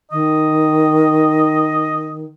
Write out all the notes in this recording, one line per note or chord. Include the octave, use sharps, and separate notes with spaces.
D#3 D#5